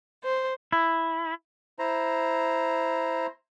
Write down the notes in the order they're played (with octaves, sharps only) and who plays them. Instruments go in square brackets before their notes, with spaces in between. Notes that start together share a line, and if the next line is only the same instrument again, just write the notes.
[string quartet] C5
[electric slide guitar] E4
[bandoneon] E4 C5 A#5